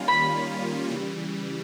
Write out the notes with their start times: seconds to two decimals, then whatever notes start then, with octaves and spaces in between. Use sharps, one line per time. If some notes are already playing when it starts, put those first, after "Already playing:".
Already playing: D#3 G3 A#3 C#4 F4
0.08 B5
0.88 C#3 E3 G3